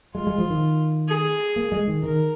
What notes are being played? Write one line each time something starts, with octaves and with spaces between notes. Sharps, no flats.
G#3 F4
G#3
F3
D#3
G#4
A#3
G#3
D#3
D#3 A#4